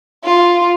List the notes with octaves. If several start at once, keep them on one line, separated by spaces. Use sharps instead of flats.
F4